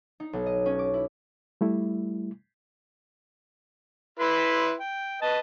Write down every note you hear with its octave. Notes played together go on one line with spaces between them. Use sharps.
D#4
B1
D#5
C#4
D6
E4
G3 A3 E4
E4 B4 C6
G5
B4 D#5 A5